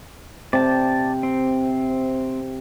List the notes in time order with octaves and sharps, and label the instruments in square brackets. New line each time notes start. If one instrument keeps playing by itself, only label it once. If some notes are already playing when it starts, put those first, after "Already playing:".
[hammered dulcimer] C3 [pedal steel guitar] D5 A5
[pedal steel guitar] C4